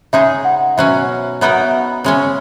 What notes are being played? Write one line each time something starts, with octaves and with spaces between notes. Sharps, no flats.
C#3 G#3 D#4 G#4 E5
F#5
B2 F#3 C#4 E5
F#3 B3 D#4 A#4 E5
F#5
E5
C#3 G#3 C#4 E5